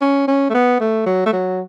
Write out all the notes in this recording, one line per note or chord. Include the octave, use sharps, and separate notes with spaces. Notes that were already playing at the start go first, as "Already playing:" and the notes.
C#4
C#4
A3
B3
A3
F#3
A3
F#3